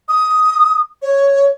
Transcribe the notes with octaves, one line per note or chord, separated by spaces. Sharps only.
D#6
C#5